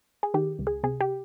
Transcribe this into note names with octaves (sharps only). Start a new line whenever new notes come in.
G#4
D#3 G4
C#2
G#4
C3 G#4
G4